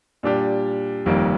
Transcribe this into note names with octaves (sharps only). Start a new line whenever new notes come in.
A#2 G3 D4 G4
G1 F2 D#3 G3 A#3